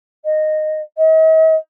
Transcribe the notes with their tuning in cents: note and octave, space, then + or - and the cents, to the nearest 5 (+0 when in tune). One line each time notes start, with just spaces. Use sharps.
D#5 -10
D#5 +45